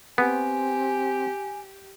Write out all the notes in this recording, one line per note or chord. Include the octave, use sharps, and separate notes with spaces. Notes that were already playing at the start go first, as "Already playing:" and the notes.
B3 C4 G4 G#5